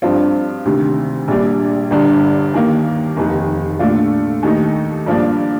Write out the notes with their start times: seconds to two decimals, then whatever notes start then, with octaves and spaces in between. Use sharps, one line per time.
0.02 G2 F3 C4 F4
0.65 D2 C3 D#3
1.28 A#1 A#2 G3 D4
1.90 G1 G2 D3
2.54 D#2 D#3 A#3
3.17 F1 D#2 D#3
3.79 A#2 A3 D4 F4
4.43 D#2 D#3 A3 D#4
5.06 G2 F3 A#3 D4